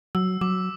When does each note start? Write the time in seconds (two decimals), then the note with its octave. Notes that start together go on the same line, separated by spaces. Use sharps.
0.15 F#3 E6
0.41 F#3 D6